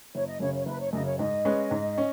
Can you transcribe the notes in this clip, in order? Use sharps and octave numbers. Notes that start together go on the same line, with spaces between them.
F#1 C#5
D#5
F#2 C#3 C#5
C#5
F#1 B4
C#5
F#2 C#3 D#5
C#5
G#2 D#5
G#3 C#4 B4
G#2
C#4